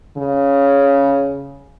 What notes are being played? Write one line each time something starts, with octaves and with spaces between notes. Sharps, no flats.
C#3